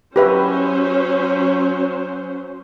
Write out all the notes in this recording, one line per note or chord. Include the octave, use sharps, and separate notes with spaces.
F#3 C#4 G4 B4 C5 E5